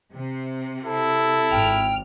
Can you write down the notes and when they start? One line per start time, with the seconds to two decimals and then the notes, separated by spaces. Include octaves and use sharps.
0.15 C3
0.83 E4 A4
1.51 G#1 G5 F6